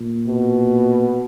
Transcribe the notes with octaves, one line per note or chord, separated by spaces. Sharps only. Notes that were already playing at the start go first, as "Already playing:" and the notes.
Already playing: A#2
B2